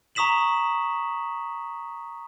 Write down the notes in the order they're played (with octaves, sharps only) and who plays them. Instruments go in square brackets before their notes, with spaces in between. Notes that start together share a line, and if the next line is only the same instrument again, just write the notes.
[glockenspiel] A#5 C#6 D#6 B6 E7 F#7